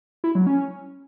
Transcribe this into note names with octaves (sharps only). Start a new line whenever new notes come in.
E4
F#3
C#4